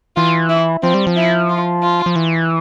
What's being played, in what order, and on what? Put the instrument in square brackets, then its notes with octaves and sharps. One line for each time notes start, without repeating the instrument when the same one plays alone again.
[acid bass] E3 [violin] F4
[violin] E4
[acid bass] F3 [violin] C4
[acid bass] G3
F3
[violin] E4
F4
F4
[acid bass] F3
E3